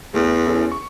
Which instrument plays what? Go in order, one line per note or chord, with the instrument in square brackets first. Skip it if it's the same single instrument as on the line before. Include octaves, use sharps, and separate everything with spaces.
[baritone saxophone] E2 [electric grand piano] A3
[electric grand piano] C#4 E4 A4
C#6